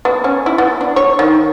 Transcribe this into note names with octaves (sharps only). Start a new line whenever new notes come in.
B3
C#4
E4
B3
D4
C#5
D#3